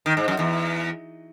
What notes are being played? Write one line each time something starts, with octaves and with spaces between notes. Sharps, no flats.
D#3
G#2
F#2
E2